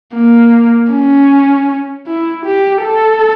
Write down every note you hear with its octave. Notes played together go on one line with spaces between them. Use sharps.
A#3
C#4
E4
G4
A4